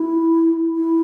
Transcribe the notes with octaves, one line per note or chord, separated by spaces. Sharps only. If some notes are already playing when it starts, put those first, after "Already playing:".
Already playing: E4
E4